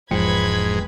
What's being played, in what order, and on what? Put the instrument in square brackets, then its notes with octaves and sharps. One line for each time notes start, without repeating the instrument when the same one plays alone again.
[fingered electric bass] E1 [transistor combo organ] G#2 [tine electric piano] F3 G5 C#7 [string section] B4 B5 G#6